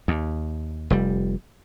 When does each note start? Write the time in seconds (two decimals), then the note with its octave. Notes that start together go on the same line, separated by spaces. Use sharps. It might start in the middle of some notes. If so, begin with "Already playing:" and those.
0.08 D#2
0.90 F1 G3